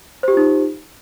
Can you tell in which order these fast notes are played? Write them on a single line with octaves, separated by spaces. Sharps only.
C5 G4 F4 D#4